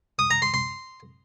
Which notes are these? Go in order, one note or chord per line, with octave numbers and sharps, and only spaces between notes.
D#6
A#5
C6
C6